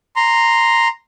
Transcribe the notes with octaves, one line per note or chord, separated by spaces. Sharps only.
A#5 C6